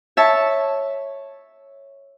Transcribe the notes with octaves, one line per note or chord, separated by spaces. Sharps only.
C#5 E5 A5